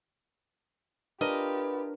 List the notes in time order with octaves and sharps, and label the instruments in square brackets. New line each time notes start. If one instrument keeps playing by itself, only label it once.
[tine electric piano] D4 A#4 [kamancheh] F4 G4 [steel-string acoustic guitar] B4 [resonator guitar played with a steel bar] D#5